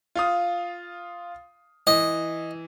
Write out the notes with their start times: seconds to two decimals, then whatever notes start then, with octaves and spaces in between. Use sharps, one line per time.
0.15 F4 F5 D#6
1.87 E3 D#5